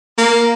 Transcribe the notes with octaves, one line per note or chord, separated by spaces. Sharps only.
A#3